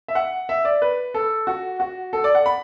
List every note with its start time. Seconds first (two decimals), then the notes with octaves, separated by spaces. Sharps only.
0.08 E5
0.15 F#5
0.49 E5
0.65 D5
0.82 B4
1.14 A4
1.47 F#4
1.80 F#4
2.13 A4
2.24 D5
2.35 F#5
2.46 B5